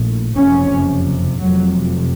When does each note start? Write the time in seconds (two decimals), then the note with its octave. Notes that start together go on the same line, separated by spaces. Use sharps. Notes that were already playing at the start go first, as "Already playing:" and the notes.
Already playing: A#1 A2
0.36 F#1 F2 C3 C#4
1.39 F1 F2 C3 F#3